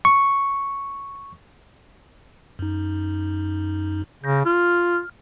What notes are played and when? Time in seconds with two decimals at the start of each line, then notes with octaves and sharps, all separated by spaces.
0.05 C#6
2.59 F#2 D#4
4.24 C#3 G6 A#6
4.45 F4 F6